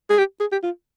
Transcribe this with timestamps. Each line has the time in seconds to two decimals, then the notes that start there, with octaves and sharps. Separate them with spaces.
0.10 G#4
0.18 G4
0.40 G#4
0.52 G4
0.63 F4